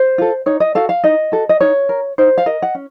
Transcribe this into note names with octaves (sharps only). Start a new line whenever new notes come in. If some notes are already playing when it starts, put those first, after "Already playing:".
Already playing: C5
F4 A4
D#4 C#5
D#5
F#4 A4 F5
F5
D#4 D#5
F#4 A4
D#5
D#4 C#5
A#4
D#4 C5
F5
A#4 D#5
F#5
C#4